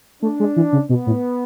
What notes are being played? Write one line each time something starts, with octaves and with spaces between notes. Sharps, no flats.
A3 D4
G#3
E3
C#3
B2 B3
A2